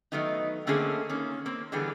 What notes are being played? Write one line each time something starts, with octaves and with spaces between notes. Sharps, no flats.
D#3 F#3 A3 B3 D#4
D3 A3 A#3 C4 C#4 G#4
D#3 A#3 C#4
A#3 C4
D3 E3 G3 B3 G#4